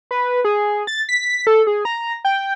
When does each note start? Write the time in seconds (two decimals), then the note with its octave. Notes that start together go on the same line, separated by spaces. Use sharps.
0.11 B4
0.45 G#4
0.87 A6
1.09 B6
1.47 A4
1.67 G#4
1.85 A#5
2.25 G5